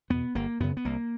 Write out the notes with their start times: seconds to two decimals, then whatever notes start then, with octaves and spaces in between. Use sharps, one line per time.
0.10 E2 B2 B3
0.35 G1 A#3
0.60 F#2 C#3 B3
0.77 B3
0.85 C2 A#3